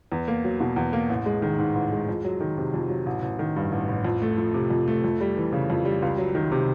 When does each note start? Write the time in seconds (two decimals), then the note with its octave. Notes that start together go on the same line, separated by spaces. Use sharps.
0.12 E2
0.28 A#3
0.44 F#3
0.60 B2
0.76 E2
0.93 A#3
1.09 A1
1.26 G#3
1.42 D#3
1.58 G#2
1.75 A1
1.92 G#3
2.09 F2
2.25 F#3
2.40 D#3
2.58 C3
2.74 F2
2.89 F#3
3.06 A1
3.22 A1
3.39 D#3
3.56 G2
3.72 A1
3.88 A1
4.04 F2
4.22 A3
4.38 F3
4.54 C3
4.70 F2
4.88 A3
5.04 F2
5.21 G3
5.37 E3
5.52 C#3
5.70 F2
5.85 G3
6.02 C#2
6.18 F#3
6.35 D#3
6.52 C3